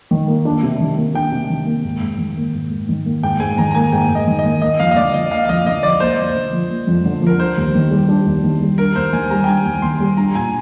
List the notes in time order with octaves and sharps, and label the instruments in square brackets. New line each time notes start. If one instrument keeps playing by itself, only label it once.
[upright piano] D#3
A#3
D4
C3
D#3
A#3
[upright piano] D4 [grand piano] G5
[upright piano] C3
D#3
A#3
G#2
G#2
D#3
A#3
G#2
G#2
D#3
A#3
[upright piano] G#2 [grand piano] G5
[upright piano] G#2 [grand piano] G#5
[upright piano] D#3 [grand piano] A#5
[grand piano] A#5
[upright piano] A#3 [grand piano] G#5
[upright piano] G#2 [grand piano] G5
[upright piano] G#2
[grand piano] D#5
[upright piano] D#3
[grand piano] D#5
[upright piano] A#3
[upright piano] A#3 [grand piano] D#5
[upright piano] F2 [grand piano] F5
[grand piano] D#5
[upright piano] D3 [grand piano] D5
[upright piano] F3 [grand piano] D#5
[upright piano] A#3 [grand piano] F5
[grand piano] F5
[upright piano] F2 [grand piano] D#5
[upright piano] D3 [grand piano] D#5
[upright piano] F3 [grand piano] D5
[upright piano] A#3 [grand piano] C5
[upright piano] F2
D3
F3
A#3
F2
D3
[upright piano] F3 [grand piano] A#4
[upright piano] D4 [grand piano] C5
[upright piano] D#2
D#3
G3
D4
D#2
D#3
G3
[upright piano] D4 [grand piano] A#4
[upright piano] D#2 [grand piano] C5
[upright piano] D#3 [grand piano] G#5
[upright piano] G3 [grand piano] A#5
[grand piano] G5
[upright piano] D4 [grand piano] G#5
[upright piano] D#2
[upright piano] D#3 [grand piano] C6
[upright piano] G3
[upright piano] D4 [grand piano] A#5
[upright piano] A#2 [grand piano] G#5